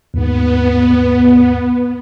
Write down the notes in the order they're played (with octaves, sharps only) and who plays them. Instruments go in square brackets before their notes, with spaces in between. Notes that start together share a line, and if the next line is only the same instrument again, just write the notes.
[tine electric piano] D#2 G#2 [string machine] B3